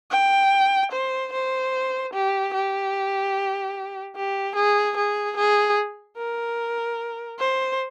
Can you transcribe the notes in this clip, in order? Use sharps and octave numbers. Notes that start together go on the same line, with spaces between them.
G5
C5
C5
G4
G4
G4
G#4
G#4
G#4
A#4
C5